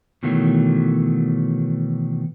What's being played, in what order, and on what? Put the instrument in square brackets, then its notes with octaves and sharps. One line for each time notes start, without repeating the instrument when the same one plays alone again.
[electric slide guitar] B2 D#3 E3 F#3 A3